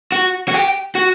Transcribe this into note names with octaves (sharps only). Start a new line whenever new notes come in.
F#4
F#4
G4
F#4